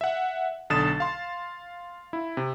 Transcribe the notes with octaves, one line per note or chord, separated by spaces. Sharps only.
E5 F#5
B1 D3 D#6 A6 E7
F5 C6
E4
C3